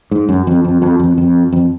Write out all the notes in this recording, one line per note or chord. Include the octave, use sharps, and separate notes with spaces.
G#2
F#2
F2
F2
F2
F2
F2
F2